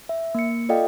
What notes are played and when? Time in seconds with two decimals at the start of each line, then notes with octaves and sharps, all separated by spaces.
0.09 E5
0.35 A#3 C#7
0.69 F4 A4 D5 D#5 F5 G5